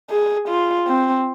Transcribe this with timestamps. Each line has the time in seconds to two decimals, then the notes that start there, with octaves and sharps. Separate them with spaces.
0.10 G#4
0.48 F4
0.87 C4